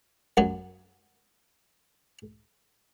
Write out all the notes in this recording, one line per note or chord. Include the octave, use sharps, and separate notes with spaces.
F#2 F#3